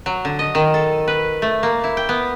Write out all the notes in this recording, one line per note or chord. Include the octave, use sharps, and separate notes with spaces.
F#3
D3
D#5
D#3
A4
B4
A3
A#3
E4
G5
B3